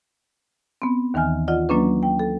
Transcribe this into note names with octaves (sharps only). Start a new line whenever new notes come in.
B3 C4
D#2 D#3 E3 G#5 F6
F4 D5 D#5 F#5
F#3 A#3 C#4 D4 B4
G5
A4